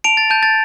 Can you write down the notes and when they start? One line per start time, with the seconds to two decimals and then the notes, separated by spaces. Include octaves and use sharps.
0.04 A5 D7 F7
0.17 A6
0.30 A5 G6
0.43 A6